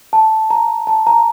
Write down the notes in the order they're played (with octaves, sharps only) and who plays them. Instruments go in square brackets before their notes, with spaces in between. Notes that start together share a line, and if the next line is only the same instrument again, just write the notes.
[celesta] A5
A#5
A5
A#5